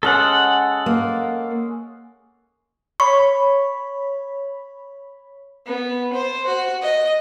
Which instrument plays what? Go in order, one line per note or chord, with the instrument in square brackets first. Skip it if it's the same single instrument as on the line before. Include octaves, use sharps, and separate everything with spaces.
[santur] G#3 C#4 D#5 [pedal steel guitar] A4 F#5
[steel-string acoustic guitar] A#3
[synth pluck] C#5 B5 [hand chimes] C#6
[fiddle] B3
C5
F#4
D#5